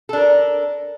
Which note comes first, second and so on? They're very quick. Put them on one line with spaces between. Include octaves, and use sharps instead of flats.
A4 D4 A#4